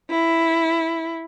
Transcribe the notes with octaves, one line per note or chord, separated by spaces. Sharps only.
E4